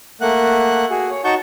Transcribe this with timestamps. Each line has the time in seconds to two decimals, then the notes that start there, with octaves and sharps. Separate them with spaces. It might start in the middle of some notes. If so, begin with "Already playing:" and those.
0.21 A3 A#3 F#5 F#6
0.90 F#4 G#4
1.10 C#5
1.24 D#4 F#4 F#5 A5 C#6 G6